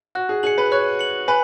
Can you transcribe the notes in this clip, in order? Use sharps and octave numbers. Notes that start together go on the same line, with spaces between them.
F#4 F#6
G#4
G#4 C#7 F#7
B4
C#5 F#6
C#7 F#7
B4 G#5